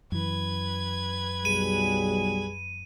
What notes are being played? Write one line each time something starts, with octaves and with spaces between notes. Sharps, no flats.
F#2 E3 B4 G#6
B1 G3 G#4 D#7